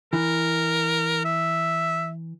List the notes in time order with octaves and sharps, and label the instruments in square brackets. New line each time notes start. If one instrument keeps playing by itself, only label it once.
[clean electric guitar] E3 [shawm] A#4
[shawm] E5